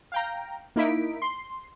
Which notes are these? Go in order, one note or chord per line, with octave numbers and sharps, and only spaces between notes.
F5 G5 A#5
A#3 D#4 E4 B6 D7
C6